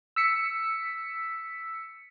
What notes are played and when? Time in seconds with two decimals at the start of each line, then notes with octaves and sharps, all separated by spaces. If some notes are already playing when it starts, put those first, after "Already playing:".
0.16 E6 B6 C#7